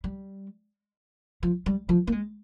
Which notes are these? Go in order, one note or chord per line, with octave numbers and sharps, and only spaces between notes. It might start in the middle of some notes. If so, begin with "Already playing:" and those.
G3
F3
G3
F3
A#3
G#3